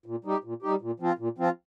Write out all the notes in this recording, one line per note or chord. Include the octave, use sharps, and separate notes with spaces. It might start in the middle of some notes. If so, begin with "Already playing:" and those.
A#2
G3 D#4 G4
A#2
G3 D#4 G4
A#2
F3 C4 F4
A#2
F3 C4 F4